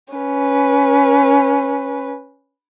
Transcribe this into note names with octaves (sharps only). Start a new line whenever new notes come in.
C#4 B4